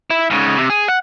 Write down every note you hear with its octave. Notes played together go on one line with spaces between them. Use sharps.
E4
G#2 C#3
C3
G#4
F#5